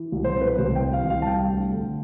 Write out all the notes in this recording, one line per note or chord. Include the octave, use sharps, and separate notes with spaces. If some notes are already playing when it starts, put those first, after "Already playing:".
Already playing: E3
C2
C5
C3
B4
C2 C5
G5
E3
F5
C2
F5
A5
G3 G5
D2
D3